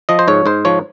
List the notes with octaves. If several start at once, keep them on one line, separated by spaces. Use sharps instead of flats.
F3 D#5
C5
G#2 C#5
G#2 C5
F3 C#5